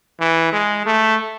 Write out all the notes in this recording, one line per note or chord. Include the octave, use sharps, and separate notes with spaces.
E3
G#3
A3